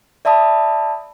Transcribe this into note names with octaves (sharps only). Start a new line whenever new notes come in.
D5 E5 A5 B5 D#6